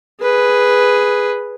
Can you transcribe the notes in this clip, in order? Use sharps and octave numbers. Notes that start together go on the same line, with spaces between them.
G#4 B4